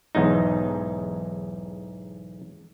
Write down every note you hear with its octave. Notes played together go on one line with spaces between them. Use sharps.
B1 E2 G#2 D#4